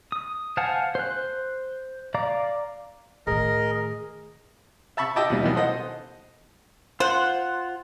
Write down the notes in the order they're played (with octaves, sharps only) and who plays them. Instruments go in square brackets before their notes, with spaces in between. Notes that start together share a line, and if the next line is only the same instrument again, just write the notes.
[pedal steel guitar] D#6
C5 F5 F#5 G#5 A5
C5 F#6
D5 F5 A#5 D6
[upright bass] A2 D#3 [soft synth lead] G#4 [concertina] A#4 D#5
[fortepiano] E5 A5 B5 C#6
G4 D#5 E5 A5 D6
D#2 B2 G3
B2 D#3 E3 F#3
A4 C5 D#5 F#5
[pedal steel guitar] F4 F#5 [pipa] C5